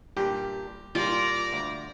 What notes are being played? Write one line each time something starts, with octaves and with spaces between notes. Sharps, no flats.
G2 A#2 G4
A#2 G3 F4 D5 A#5
D2